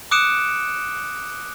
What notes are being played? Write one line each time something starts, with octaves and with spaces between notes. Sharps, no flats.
D6 D#6 F#6 C#7 D7 E7